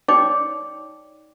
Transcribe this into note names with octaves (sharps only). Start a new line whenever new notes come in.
D#4 C#5 D5 G5 D6